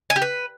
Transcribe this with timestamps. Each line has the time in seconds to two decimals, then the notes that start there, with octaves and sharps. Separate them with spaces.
0.10 G#5
0.16 G4
0.22 B4